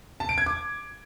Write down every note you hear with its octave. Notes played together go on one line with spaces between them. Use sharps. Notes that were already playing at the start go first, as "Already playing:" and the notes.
A5
D7
G#6
D6